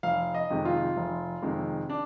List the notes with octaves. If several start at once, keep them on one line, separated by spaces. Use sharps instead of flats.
F1 F5
D#5
F2 C3 D#3 G#3
F4
F1
F2 C3 D#3 G#3
D4